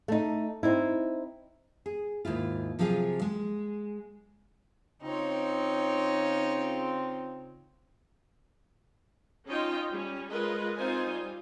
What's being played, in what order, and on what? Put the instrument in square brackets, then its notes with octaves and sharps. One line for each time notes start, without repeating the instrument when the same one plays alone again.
[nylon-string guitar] A3 D#4
C4 D#4 E4
G#4
D#2 G#2 E4 F4
C3 F3 F#3 F4 G#4
G#3
[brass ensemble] C#3 C4 F4 [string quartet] D#4 C#5
[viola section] C#4 D#4 F4 C#5 D#5 G5
G3 C#4
G#3 F4 A#4 B4 C#5 D#5
C4 D#4 F4 C5 G#5
G3 F4